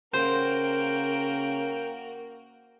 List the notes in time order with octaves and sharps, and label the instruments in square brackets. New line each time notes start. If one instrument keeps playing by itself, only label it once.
[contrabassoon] C#3 [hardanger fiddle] A#3 F#4 [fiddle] A#4 G5 [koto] C5